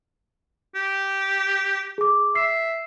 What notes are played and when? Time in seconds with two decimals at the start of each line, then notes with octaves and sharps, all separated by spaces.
0.75 G4
1.98 G#4 D6
2.35 E5 C7